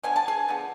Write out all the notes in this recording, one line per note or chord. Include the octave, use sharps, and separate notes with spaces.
D3 F3 B3 G#5
A5
G#4 G#5
D3 F3 B3